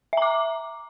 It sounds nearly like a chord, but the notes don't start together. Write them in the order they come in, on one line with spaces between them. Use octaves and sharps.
E5 A#5 D6